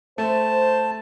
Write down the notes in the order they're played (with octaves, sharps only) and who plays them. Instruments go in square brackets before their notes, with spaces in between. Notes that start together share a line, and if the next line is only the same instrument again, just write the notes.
[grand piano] A3 [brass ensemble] C5 [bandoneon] A5